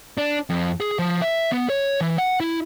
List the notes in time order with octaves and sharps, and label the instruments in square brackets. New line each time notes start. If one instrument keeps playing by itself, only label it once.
[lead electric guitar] D4
F2
G#4
F3
E5
B3
C#5
E3
F#5
E4